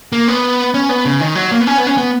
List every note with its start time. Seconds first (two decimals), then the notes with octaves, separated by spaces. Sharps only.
0.12 A#3
0.28 B3
0.74 C#4
0.89 B3
1.05 C#3
1.21 D#3
1.35 F#3
1.52 A#3
1.60 B3
1.67 C#4
1.78 B3
1.87 C#4
1.97 B3